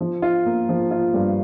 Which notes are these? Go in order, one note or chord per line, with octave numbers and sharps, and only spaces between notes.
F3
F4
A#3
F3
F4
G2